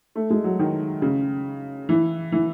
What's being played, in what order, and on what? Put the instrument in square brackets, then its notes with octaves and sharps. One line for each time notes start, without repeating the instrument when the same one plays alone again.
[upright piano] A3
G#3
F#3
D#3
C#3
E3
E3